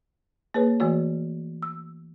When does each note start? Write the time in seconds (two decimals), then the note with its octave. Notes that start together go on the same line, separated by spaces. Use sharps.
0.54 A#3 G#4 B4 C#5
0.80 E3 A3 F#4 C#5
1.63 E6